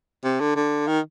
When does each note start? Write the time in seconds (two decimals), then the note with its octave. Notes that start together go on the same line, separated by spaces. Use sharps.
0.24 C3
0.40 D3
0.56 D3
0.87 D#3